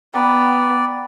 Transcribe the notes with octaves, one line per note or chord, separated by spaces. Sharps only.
B3 D5 G5 A#5 B5